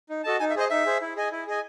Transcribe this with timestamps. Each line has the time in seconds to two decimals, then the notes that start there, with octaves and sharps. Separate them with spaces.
0.09 D#4
0.24 F#4 A4 D#5 A5
0.40 D#4 G#5
0.50 E5
0.56 G#4 C5 D#5
0.70 D#4 E5
0.86 G#4 C5
1.01 E4
1.16 G#4 D#5 G#5
1.32 E4
1.47 G#4 D#5 G#5